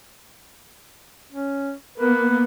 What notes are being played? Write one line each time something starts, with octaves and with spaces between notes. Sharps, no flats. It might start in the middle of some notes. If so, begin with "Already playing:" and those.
C#4
A#3 B3 B4